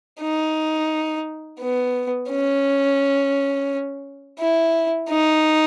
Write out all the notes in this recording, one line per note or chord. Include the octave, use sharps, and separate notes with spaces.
D#4
B3
C#4
E4
D#4